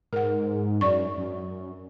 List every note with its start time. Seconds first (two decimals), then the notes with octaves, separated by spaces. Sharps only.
0.13 G#2 A#4 F#5
0.81 F#2 D5 C#6
1.18 F#2